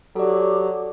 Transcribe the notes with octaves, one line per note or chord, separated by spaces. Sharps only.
F#3 G4 A4 D5